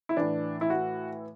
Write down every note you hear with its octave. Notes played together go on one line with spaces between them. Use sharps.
E4
A2 E3 D4
E4
F#4